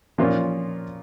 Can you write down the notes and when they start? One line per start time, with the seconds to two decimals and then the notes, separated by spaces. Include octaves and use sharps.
0.18 A#2 F3 C#4 F4 A#4